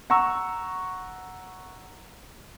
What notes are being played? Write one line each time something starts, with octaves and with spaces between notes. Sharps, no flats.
F#5 A#5 C#6 E6